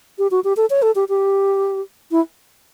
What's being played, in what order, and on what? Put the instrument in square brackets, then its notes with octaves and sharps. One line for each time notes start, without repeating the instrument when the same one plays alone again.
[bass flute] G4
F#4
G4
A4
C#5
A4
G4
G4
E4